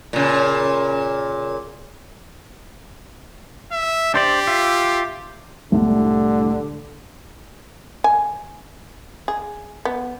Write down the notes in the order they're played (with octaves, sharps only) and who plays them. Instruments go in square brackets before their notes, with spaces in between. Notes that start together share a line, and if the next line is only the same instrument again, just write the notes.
[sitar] A#2 C#3
[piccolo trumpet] E5
[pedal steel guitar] D4 C5 D5 [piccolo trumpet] G4
[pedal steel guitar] F4 E5
[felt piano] C2 A2 G3 [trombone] D3
[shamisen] G#5
G#4
B3